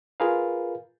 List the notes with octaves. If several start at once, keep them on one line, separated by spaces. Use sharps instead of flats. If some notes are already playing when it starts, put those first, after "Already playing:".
F4 G#4 A#4 B4 F5